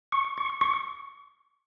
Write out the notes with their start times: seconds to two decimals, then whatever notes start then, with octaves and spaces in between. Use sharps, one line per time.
0.12 C#6
0.38 C#6
0.61 C#6